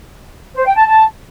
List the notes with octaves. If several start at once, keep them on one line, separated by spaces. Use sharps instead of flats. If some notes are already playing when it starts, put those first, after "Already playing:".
C5
G5
A5
A5